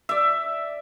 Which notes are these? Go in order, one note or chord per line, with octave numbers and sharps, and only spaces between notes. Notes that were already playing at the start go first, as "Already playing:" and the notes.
D5 E5